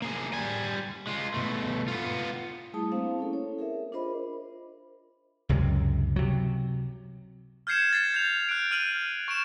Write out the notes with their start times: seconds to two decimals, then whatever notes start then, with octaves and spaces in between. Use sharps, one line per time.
0.02 A#3 G#4
0.33 G3 G#5
1.07 G#3 F4
1.34 B2 A3
1.88 B3 F4
2.73 G3 A3 E4 G#4 A5 D#6
2.92 A#3 C4 D4 C5 F5
3.18 C#4 E4 A4
3.33 C#5
3.58 G#4 A#4 E5
3.92 D4 F4 A#4 C5 D#5 B5
5.49 C#2 F#2 C3 G#3
6.16 C3 F#3
7.67 F6 G6 G#6 C7 C#7 E7
7.93 A6 C7
8.14 G6 F7
8.49 F#6 D7
8.71 F6 D#7 F#7
9.28 C#6 D7 E7